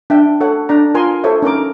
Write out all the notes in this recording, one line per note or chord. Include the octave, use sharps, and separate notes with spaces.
D4 E5 G5
A4 C#5 F#5
D4 D5 A#5
F4 A#4 G#5 C6
A4 C5 C#5 E5
C#4 D#4 A#4 D6